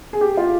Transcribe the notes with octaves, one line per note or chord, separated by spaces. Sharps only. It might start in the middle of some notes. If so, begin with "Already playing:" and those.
G#4
G4
F4